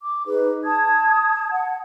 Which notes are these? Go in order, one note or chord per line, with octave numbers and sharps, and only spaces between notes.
D6
D#4 G#4 B4
A5 D#6 G#6
F#5